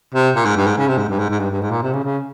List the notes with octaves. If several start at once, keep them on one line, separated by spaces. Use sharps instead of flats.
C3
A#2
G#2
G2
G#2
C#3
C3
G#2
G2
G#2
G#2
G2
G2
G#2
A#2
C3
C#3
C#3